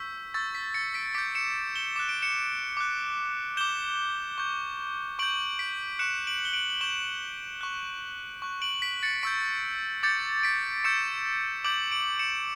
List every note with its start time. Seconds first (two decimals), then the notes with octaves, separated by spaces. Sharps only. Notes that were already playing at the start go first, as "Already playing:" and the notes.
Already playing: C#6 E6 G6 B6
0.34 C#6 E6 G6 A6
0.55 B6
0.74 A6 C#7
0.94 B6 D7
1.14 D6 G6 B6 D7
1.35 C#7 E7
1.76 E7 G7
1.96 D6 F#6 E7
2.09 D7
2.22 C#7 E7
2.77 D6 F#6
3.57 D6 G6 E7 G7
4.38 C#6 G6
5.19 C#6 G6 D7 F#7
5.59 B6 D7
5.99 C#6 F#6 C#7 E7
6.27 D7 F#7
6.45 G7
6.53 D7 F#7
6.70 F#7
6.81 C#6 G6 E7 G7
7.61 C#6 F#6
8.42 C#6 F#6
8.62 D7 F#7
8.82 B6 D7
9.03 A6 C#7
9.23 C#6 E6 G6 B6 D7
10.03 D6 G6 A6 C#7
10.43 B6 D7
10.84 C#6 E6 G6 C#7 E7
11.65 D6 G6 D7 F#7
11.92 D7 F#7
12.19 C#7 E7